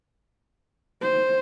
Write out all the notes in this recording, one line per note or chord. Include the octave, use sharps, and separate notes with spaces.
C5